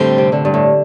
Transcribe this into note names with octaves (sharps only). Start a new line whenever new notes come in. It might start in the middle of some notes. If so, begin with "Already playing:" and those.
Already playing: A2 D3 G3 C4
C3
D3
G2
A2